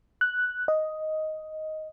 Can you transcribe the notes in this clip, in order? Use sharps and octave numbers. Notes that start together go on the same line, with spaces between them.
F#6
D#5